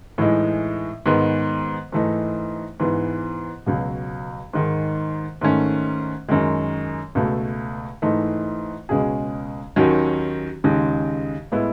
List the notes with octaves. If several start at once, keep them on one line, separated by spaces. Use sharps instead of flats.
A2 E3 G#3 D#4
G#2 D#3 G#3 B3
G#2 E3 A3 D#4
G#2 E3 B3
C#2 B2 F#3
G#2 D#3 G#3
G#2 D#3 A3 C#4
F#2 D#3 G#3
C#2 B2 A3
G#2 E3 A3 D#4
C#2 B2 G#3 C#4 G#4
D#2 D#3 F#3 C#4 F#4
D#2 C#3 G#3 D#4
A2 G#3 B3 E4